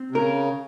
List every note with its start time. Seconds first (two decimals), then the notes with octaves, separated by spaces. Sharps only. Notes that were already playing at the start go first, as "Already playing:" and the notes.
Already playing: C4
0.11 C3
0.15 C#3 A#4